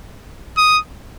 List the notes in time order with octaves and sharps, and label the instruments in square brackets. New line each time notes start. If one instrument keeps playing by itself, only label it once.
[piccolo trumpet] D#6